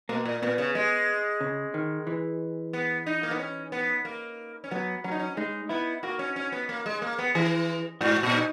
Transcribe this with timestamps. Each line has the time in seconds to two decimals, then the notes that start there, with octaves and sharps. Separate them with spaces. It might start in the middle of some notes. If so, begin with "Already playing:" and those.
0.09 B2 A#3
0.25 A#2
0.42 A#2 B3
0.58 C#3
0.75 G#3
1.41 C#3
1.74 D#3
2.07 E3
2.73 B3
3.06 D#4
3.23 A#3
3.31 B3
3.39 C#4
3.72 B3
4.05 A#3
4.64 C#4
4.71 F#3 B3
5.04 F#3 C#4
5.11 D#4
5.19 C#4
5.37 G#3 D#4
5.69 B3 E4
6.03 A#3 F#4
6.19 C#4
6.36 C#4
6.52 B3
6.69 A#3
6.86 G#3
7.02 A#3
7.18 B3
7.35 E3 G#4
8.01 G#2 F#4
8.23 A#2
8.34 D#4